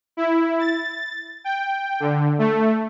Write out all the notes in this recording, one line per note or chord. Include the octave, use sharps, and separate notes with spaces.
E4
A6
G5
D3
A3